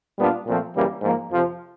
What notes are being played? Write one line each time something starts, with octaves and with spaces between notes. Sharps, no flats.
A#2 G3 B3 D4 F4
A#2 F3 A3 C4 F4
F#2 C#3 E3 G3 A#3
G#2 F3 A#3
F2 C3 F3